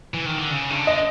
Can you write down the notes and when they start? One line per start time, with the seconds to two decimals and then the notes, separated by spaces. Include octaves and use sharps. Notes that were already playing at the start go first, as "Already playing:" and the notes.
0.14 E3
0.26 D#3
0.38 D3
0.51 C#3
0.71 D#3
0.75 D3
0.87 D#5